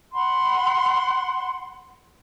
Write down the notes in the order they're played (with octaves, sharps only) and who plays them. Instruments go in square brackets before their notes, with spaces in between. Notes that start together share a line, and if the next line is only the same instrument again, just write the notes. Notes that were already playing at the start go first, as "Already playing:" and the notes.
[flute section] F#5 B5 C6